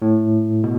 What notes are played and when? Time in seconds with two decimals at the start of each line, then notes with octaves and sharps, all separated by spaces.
0.02 A2
0.64 B2